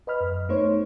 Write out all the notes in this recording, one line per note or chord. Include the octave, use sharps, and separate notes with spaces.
B4 D#5 B5 F6
F#2
A3 B3 D#4 C5 C#5